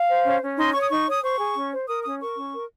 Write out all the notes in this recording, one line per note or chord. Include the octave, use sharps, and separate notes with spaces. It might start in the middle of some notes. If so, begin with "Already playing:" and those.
Already playing: F5
C5
C#4
C#4
D#4 C6
C#5 C#6
D#6
D#4 C#6
C#5 D#6
C5 C#6
G#4
C#4
C5
A#4 D#6
C#4 D#6
A#4 C#6
C#4
A#4